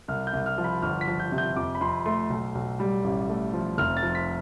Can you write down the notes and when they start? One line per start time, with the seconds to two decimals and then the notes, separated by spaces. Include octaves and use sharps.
0.08 C2 F6
0.27 G6
0.33 C2
0.46 F6
0.58 F3
0.64 B5
0.82 G1 F6
1.01 B6
1.08 F3
1.20 G6
1.32 C3
1.38 G6
1.56 F2 D6
1.75 B5
1.81 F2 C6
2.06 A3 C6
2.30 B1
2.55 B1
2.80 G3
3.04 A1
3.29 A3
3.53 F3
3.78 F1 F6
3.97 A6
4.03 F3
4.15 B6